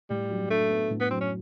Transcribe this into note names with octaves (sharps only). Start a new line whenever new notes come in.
A2 G3
F#3
A3 D4
B3
A2
B3
F#3 C4
C#4